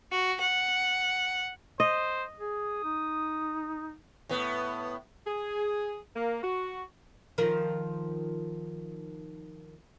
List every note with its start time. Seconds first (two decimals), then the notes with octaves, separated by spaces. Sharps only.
0.11 F#4
0.40 F#5
1.80 C5 D#5
2.39 G#4 D#6
2.84 D#4
4.29 A2 B3
5.25 G#4
6.15 A#3
6.43 F#4
7.38 D#3 F3 A#4